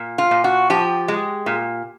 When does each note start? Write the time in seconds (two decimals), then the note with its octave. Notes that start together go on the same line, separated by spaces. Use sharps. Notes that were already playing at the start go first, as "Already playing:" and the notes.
Already playing: A#2
0.18 F4
0.31 A#2
0.44 F#4
0.70 F3 G4
1.08 G#3
1.46 A#2